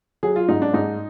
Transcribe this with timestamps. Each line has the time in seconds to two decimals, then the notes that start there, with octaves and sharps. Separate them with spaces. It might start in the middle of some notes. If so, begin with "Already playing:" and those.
0.23 F#3 G#4
0.36 F4
0.49 G#2 D#4
0.62 D4
0.73 G#2 D#4